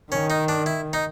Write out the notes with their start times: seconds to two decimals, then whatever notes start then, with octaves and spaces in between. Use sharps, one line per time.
0.12 D#3 C#4
0.30 D#4
0.48 D4
0.66 E4
0.93 D#4